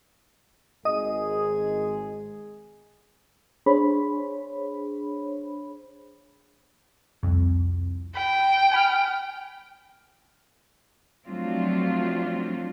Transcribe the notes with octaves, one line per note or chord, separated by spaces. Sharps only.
G#1 G#3 G#4 D#5 D#6
D4 G#4 C5 C#5 B5
C2 F2
G5 B5
G#5 B5 F6
F3 F#3 A3 C4 D4 F4